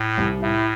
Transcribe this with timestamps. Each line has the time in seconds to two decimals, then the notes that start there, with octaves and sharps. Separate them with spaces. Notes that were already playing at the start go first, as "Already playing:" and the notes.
Already playing: A2
0.18 C2
0.42 A2 E4